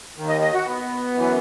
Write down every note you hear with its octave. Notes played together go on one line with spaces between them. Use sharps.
D#2 D#3
D#5
D#5
F#4
B3
F#2 E3